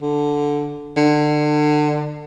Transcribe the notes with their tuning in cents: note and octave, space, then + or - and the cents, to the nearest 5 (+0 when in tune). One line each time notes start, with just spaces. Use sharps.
D3 -5
D3 +30